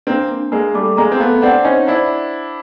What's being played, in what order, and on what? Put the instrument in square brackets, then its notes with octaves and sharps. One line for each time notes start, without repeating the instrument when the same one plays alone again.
[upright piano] A#3 C4 [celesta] D4
[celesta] D4
[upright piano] G#3 A#3 [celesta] A#4
[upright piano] G3 A3 [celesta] D6
[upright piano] G#3 A#3 [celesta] A#5
[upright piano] C4
[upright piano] A3 B3 [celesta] F5
[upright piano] C4 D4 [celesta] F#5
[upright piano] C#4 D#4 [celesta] C5
[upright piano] D4 E4 [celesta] C5